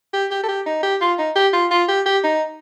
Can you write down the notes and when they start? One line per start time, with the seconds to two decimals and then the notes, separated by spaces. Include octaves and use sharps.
0.13 G4
0.31 G4
0.43 A4
0.48 G4
0.66 D#4
0.83 G4
1.01 F4
1.18 D#4
1.36 G4
1.53 F4
1.71 F4
1.88 G4
2.06 G4
2.23 D#4